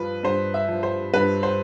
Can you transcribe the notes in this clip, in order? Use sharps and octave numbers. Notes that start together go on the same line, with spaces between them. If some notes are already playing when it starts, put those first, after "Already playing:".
Already playing: G2 F3 B4
G2 C5
E5
F3
C5
G2 B4
C5